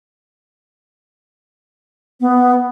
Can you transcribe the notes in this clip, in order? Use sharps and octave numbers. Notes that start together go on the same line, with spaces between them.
B3